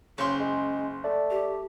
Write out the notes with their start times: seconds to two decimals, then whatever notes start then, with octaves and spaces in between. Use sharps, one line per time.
0.18 F#1 C#3 C#4 C6
0.40 G#3
1.04 A3 D5
1.30 G4